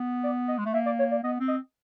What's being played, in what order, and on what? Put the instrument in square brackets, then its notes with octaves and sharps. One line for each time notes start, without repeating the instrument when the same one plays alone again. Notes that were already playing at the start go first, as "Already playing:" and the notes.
Already playing: [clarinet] B3
[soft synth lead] D5
D#5
[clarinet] G#3
A3
[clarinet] A#3 [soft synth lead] E5
[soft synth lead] D5
C#5
D5
[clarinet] B3 [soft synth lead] D#5
[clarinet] C4
[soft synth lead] D#5